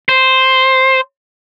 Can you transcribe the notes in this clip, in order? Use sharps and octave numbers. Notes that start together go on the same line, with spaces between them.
C5